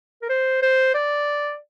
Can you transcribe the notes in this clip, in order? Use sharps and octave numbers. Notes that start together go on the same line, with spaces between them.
A#4
C5
C5
D5